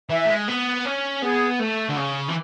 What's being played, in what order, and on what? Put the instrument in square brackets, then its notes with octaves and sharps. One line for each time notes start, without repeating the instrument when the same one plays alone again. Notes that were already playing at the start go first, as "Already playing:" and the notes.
[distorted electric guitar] E3 [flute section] E5
[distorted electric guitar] A3
G#3
B3
C#4
[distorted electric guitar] B3 [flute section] G#4
[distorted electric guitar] A3 [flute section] A4
[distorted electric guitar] D3
[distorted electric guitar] C#3 [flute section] G#4
[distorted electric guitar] E3